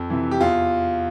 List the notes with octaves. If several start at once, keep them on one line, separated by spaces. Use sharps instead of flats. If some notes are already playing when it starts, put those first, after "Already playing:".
Already playing: F2
C3 E3
G4
E2 F4